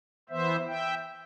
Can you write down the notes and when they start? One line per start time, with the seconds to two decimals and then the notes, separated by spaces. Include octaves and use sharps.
0.30 E3 B3 C5 E5
0.68 E5 G5